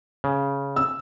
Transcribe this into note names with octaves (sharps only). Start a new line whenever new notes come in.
C#3
E6